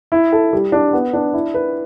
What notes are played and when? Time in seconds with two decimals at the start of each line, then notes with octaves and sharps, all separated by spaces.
0.12 E4
0.32 A4
0.53 G3
0.72 D4
0.93 B3
1.13 D4
1.33 E4
1.54 B4